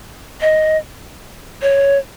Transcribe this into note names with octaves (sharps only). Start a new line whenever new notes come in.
D#5
C#5